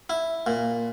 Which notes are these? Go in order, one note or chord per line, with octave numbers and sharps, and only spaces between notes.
E4
A#2